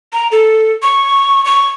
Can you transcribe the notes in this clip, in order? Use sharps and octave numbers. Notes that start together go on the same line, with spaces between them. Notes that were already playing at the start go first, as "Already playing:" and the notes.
A#5
A4
C#6
C#6